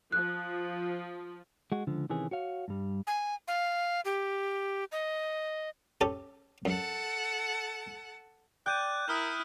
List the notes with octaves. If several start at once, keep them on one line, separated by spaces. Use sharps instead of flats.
F3 F#6
G#3 F#4
C#2 D3 F3
C3 D#3 E3 C#4 G#4
F#4 C#5 F5
G2 G3
G#5
F5
G4
D#5
C#4 G4 A4
F#2 A4 F#5 A5
D5 G5 F#6 G6 D#7
E4 A#4 D#6 F6 F#6